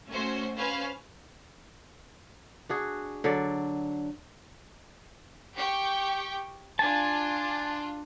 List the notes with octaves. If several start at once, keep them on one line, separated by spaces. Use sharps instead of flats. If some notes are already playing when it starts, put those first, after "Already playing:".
A3 C#4 F#4 C5
C#4 B4 C5 F5
D4 F#4 G#4
D3 F#3 D5
G4 G5 C#6
D4 F4 G#5 A5